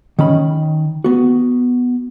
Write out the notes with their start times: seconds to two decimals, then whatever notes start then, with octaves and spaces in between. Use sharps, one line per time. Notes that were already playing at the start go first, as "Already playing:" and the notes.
0.19 D#3 C#4 B5
1.04 B3 F#4